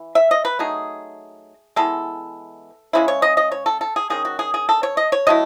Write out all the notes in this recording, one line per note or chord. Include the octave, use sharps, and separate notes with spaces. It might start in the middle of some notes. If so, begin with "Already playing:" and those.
Already playing: E3
E5
D#5
B4
F#3 A3 D#4 G#4
E3 G#3 B3 A4
C#3 G#3 C#4 E4
C#5
D#5
D#5
C#5
A4
A4
G#4
D#3 G#3 C#4 G#4
F#4
G#4
G#4
A4
C#5
D#5
C#5
F#3 A3 E4 D#5